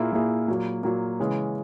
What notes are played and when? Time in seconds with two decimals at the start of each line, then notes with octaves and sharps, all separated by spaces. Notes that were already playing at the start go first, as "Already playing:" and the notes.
Already playing: A#2 A#3 E4 G#4
0.13 A#2 A#3 E4 G#4
0.48 A#2 F#3 A#3
0.83 A#2 F#3 A#3
1.19 C#3 E3 G#3 C#4